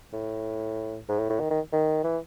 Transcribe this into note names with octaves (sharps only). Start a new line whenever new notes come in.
A2
G#2
A2
A2
D#3
D#3
D#3
E3